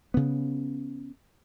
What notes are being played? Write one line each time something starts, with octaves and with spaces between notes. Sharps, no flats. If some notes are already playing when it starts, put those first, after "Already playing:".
C#3 B3